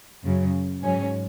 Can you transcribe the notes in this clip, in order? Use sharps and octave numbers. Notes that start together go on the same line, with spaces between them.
F#2 C#3 F#3
G#2 F#3 C#4